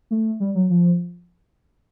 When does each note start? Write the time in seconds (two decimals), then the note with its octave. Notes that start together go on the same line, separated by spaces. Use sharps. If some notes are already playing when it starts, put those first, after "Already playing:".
0.11 A3
0.40 G3
0.55 F#3
0.70 F3